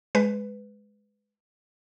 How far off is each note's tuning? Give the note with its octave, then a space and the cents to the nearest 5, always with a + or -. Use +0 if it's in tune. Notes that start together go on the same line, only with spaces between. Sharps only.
G#3 +0 B4 +10